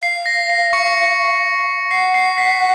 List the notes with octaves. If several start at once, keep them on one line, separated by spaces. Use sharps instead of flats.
F5 C7
A#6
C7
C#6 C#7
F#5 C7
C7
B6